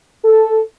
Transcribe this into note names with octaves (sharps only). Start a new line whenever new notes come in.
A4